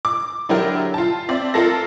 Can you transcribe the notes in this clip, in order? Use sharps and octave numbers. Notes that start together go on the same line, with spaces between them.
D6
D3 F#3 D4 E4 G4 A#4
F4 A5
C4 D5 E5
F4 A4 A#4 A5 A#6